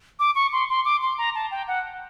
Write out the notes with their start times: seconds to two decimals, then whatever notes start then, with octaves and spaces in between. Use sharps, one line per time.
0.19 D6
0.35 C#6
0.53 C6
0.69 C6
0.85 D6
1.02 C6
1.18 A#5
1.35 A5
1.51 G5
1.68 F#5